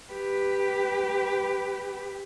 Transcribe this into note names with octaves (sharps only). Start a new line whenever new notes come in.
G4 B4